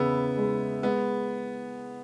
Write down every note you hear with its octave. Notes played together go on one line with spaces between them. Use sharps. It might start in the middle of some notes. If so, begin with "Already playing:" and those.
Already playing: E2 C#3 B3 E4
G#3
G#3 B3